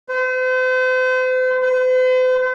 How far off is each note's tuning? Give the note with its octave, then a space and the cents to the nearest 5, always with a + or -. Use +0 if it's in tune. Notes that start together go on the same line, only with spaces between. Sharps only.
C5 -40
C5 -45